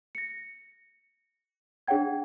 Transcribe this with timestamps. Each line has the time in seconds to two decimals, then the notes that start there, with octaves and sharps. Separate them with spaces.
0.15 A#6 C#7
1.88 D4 G#4 C#5 F#5 G5 G#6